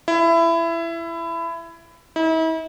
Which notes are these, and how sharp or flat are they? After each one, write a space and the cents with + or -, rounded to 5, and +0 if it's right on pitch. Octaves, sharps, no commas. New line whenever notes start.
E4 +20
E4 -40